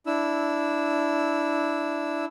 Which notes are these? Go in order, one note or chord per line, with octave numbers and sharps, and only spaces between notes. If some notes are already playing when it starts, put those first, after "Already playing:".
D4 E4 E6